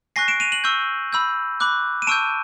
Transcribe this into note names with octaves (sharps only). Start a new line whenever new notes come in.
G#5 C#6 F#6 A#6 C7
D7 E7
D#7 F7
E7 F#7
C#6 E6 G6
B5 E6 G6
B5 D6 F#6
D#7
A5 C#6 E6 G6 D7 E7